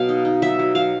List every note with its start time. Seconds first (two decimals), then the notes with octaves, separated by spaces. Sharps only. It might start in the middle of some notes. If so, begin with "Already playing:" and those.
Already playing: B2 F#3 F5
0.09 D#4
0.25 D#4
0.42 F#3 E5
0.59 F#3
0.75 F#3 F5